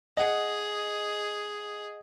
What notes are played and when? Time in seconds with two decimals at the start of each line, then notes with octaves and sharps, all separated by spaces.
0.17 G#4 D#5 F#5